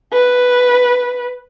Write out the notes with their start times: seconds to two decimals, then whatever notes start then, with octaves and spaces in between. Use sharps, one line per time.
0.13 B4